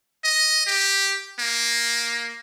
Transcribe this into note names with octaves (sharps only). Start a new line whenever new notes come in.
D#5
G4
A#3